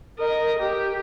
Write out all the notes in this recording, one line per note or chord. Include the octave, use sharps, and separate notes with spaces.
A#4 D#5
G4